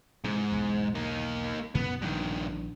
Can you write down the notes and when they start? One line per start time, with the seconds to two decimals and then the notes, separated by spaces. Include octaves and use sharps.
0.24 G#2 C3 E3
0.52 B1 E2
0.95 A#3 D#4
1.75 F#2 B2 D#3 B3
2.02 A#1 G2 D#3 E3 D4